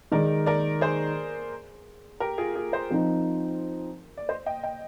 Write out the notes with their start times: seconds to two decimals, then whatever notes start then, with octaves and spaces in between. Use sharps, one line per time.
0.12 D#3 G#3 D#4 A#4 D5
0.46 A#4 D5
0.81 G#4 C5
2.20 G4 A#4
2.38 F4 G#4
2.55 F4 G#4
2.72 G#4 C5
2.90 F3 C4 D#4
4.17 D5
4.29 C5 D#5
4.46 D#5 G5
4.63 D#5 G5